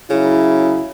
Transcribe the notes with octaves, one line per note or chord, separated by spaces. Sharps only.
C#3 F#3 C#4 E4